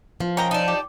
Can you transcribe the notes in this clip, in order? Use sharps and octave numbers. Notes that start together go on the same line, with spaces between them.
F3
C#4 A#4 D#5 G5 A#5
D#4 D5 A5
G4